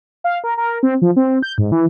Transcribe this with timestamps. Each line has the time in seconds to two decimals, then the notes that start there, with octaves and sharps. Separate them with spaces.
0.24 F5
0.44 A#4
0.57 A#4
0.83 C4
1.02 F3
1.16 C4
1.43 G6
1.58 G#2
1.72 E3